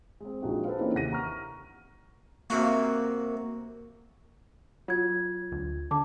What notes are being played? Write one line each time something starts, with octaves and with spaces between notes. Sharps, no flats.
G#3 C4
A#1 F3 G#3 D#4 F#4 G4
A4 B4 C5 F5
E3 A#3 C4 C#4 D#4 G4
D#2 C3 F#5 A#6 D#7
A#5 C#6 F6
C3 A#3 F#4
F#3 F4 G#6
D2
D3 A5 D6